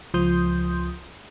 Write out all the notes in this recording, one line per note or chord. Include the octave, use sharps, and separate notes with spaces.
C#2 F3 C6 D#6 G6